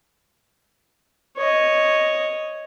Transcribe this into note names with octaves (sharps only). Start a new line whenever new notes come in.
C#5 D#5